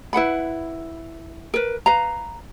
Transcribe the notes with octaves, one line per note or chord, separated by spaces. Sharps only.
E4 B4 F#5 B5
A#4 B4
B4 F5 A#5